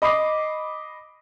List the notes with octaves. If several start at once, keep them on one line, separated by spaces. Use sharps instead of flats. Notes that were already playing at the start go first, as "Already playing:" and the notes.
D#5 B5 D6 D#6 C7